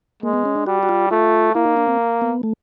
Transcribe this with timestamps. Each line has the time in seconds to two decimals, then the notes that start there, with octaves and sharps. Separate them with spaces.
0.23 G#3 A#3
0.34 B3
0.45 C#4
0.56 D4
0.67 G3 F#4
0.83 F#4
0.89 F4
1.11 A3 F4
1.55 A#3 E4
1.65 D#4
1.77 D4
1.87 C4
2.22 B3
2.43 A3